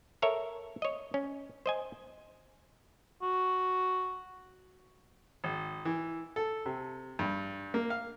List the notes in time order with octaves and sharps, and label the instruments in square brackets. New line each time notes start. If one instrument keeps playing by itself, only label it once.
[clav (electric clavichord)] A4 A#4 C#5 E5
C#5 D#5
C#4
C5 D#5 G#5
[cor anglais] F#4
[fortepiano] G#1
E3
A4
C3
G2
A#3
F5